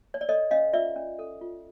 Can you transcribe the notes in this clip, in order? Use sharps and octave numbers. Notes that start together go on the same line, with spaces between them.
C#5
D5
A4 C#5 D#5
C#4 D#5 F5
F4 D5 E5
C#4
A4
F4